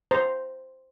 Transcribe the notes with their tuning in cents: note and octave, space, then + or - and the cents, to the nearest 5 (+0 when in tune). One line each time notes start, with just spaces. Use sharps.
C5 +0 A#5 +0